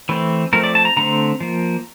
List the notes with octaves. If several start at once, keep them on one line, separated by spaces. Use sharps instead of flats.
E3 A3 C4
F3 A3 C4 A#4
D5
A5
A#5
D3 A3 C4 A#5
F3 A#3